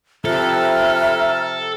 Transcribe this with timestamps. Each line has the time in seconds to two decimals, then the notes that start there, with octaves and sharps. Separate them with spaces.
0.25 C3 F3 A4 E5 A#5 F6 F#6